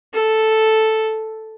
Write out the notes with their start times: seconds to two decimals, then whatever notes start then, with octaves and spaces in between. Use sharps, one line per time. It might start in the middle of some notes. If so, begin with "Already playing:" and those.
0.13 A4